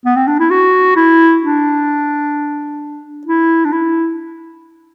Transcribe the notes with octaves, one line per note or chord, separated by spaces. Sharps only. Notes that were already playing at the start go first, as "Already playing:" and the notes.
B3
C4
D4
E4
F#4
E4
D4
E4
D4
E4